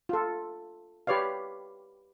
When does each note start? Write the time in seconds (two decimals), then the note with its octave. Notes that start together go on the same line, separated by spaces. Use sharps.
0.09 F4 A4
1.07 G4 B4 C#5 D5 F5